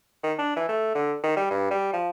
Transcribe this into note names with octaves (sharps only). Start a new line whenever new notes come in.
D#3
D4
E3
A3
D3
D#3
G3
G2
G3
F3